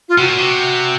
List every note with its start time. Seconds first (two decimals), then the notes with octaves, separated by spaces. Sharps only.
0.09 F4
0.18 C3 F#4
0.28 A#2
0.38 C3